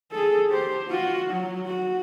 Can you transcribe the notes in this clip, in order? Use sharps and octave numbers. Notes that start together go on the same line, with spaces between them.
G#4 A4
G4 C5
F4 F#4
F#3
F#4